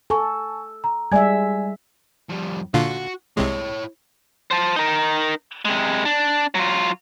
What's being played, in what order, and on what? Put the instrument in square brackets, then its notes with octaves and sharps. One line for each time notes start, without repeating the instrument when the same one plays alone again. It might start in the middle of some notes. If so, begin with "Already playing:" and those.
[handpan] A4 [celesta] G#5 A5 C#6
[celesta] A#5
[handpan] G3 G#3 E5 [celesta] D5 G#5 G#6
[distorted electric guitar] F2 G3
[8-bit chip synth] A#2 D3 F4 [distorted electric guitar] F#4
[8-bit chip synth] C2 C3 G#3 [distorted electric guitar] E4 C#5
[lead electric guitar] C5 A5
D#4 A#4
C3 G#3
D4
F#3 F4